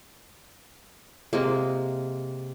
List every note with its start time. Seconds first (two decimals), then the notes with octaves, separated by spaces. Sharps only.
1.33 C3 G#3 A#3